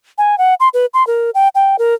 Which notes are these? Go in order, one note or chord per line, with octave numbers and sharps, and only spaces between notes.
G#5
F#5
C6
B4
C6
A#4
G5
G5
A#4